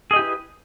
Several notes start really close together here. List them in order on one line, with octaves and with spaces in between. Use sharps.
G#4 D#5 G4 E4 B4